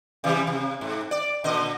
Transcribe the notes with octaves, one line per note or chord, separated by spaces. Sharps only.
C3 E3 G3
C3
G#2
D5
A#2 D3 D#5